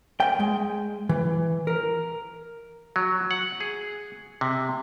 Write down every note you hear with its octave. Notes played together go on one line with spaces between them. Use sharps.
G5
G#3
E3
A#4
F#3
F#5
G#4
C3